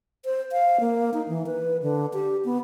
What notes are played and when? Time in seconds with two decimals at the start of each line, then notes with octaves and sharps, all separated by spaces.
0.25 C5
0.52 F5
0.80 A#3
1.14 D#4
1.28 E3
1.46 B4
1.82 D3
2.14 G4
2.45 B3